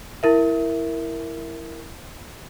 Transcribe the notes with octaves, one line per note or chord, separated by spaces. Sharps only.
E4 A#4 E5